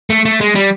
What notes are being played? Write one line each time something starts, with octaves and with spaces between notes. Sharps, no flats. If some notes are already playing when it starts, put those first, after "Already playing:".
A3
A3
G#3
G3